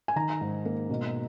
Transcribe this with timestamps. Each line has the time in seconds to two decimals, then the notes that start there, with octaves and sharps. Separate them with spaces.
0.08 G#5
0.16 D#3 A#5
0.41 G#2
0.65 A#3
0.90 B2